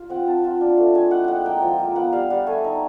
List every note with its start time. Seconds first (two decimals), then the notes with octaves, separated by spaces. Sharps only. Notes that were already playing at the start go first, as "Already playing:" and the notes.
Already playing: F4
0.10 C4 F#5
0.26 C4 A5
0.44 F4
0.61 D4
0.77 A3
0.95 G#3 G#5
1.11 E4 F#5
1.24 G#3 F#5 G5
1.45 A#3 G5
1.62 F3
1.79 A#3
1.95 B3 F#5
2.13 G3 F5
2.30 G3 F#5
2.47 A3 G#5
2.64 D#4